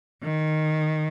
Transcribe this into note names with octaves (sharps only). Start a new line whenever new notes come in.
D#3